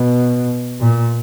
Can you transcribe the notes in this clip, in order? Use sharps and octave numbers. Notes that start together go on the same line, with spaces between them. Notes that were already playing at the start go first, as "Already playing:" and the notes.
Already playing: B2
A#2